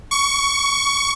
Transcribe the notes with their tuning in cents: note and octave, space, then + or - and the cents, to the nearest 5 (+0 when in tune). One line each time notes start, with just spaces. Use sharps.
C#6 +15